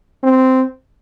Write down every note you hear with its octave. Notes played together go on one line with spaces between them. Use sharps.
C4